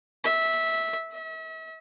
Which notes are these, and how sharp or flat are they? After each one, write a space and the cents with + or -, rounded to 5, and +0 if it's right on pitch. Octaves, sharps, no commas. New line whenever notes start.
E5 -15
E5 -40